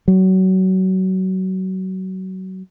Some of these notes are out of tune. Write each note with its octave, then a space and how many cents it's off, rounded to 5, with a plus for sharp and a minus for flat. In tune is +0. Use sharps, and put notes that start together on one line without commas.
F#3 +25